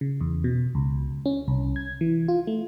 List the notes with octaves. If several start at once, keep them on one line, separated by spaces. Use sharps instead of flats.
C#3
E2
B2
C#2
C#4
C2
G#6
E3
F4
A3